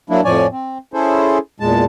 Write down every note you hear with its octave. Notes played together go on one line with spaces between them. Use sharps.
F#3 A#3 D4 E4
F2 A2 F3 C#5 D5 G#5
C4
C#4 E4 G#4 A4 C5
E2 A#2 G#3 A5